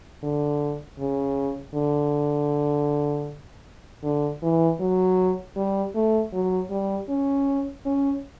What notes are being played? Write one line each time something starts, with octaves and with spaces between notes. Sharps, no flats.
D3
C#3
D3
D3
E3
F#3
G3
A3
F#3
G3
C#4
C#4